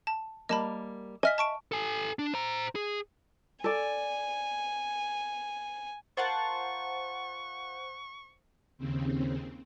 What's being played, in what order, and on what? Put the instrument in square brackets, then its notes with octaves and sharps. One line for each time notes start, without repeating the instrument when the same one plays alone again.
[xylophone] A5
[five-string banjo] G3 A#3 [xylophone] D#5 A5 B5
[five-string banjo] D#5 E5 [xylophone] G#5 F6 B6
[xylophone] A5 C#6 D7
[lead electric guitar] A4 G#5
D4
C5 A#5
G#4
[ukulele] A4 D5 [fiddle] G#5
[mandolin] F4 A#4 A5 [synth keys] C5 F#5 [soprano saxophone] C#6
[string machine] D#2 C#3 C4